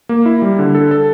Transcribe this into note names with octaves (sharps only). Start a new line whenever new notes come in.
A#3
E4
G3
D3
A4
A4